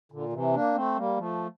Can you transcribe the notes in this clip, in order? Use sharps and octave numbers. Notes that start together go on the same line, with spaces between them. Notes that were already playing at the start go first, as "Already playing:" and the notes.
A#2 D3
D3
C3 E3
A#3 D4
A3 C4
G3 A#3
F3 A3